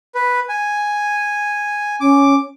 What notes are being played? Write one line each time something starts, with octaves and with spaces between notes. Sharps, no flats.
B4
G#5
C#4 D6